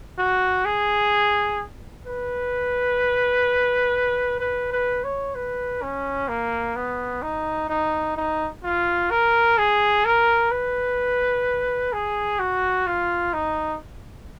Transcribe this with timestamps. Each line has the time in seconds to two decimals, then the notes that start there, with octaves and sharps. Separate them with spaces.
0.18 F#4
0.65 G#4
2.06 B4
4.40 B4
4.72 B4
5.04 C#5
5.35 B4
5.82 C#4
6.28 A#3
6.76 B3
7.22 D#4
7.69 D#4
8.17 D#4
8.64 F4
9.11 A#4
9.58 G#4
10.05 A#4
10.51 B4
11.93 G#4
12.39 F#4
12.87 F4
13.33 D#4